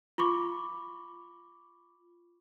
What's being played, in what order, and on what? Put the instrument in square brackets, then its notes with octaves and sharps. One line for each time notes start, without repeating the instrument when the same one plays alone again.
[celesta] F4 B5 C#6 D6